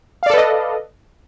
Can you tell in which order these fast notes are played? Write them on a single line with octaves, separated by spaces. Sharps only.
F5 D5 A4 B4 D#5